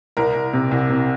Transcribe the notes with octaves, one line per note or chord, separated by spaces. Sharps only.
C2 A#4
C2
C3
C2
C3